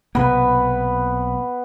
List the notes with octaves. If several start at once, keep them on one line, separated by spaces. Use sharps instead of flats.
B1 C3 A#3 B3 B4